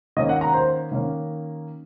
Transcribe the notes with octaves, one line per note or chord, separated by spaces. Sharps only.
D#3 A#3 C#4 D#5
F#5
A#5
C5
D#3 A#3 C#4